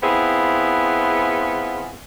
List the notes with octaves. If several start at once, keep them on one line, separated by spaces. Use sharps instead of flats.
B3 C4 E4 F4 G#4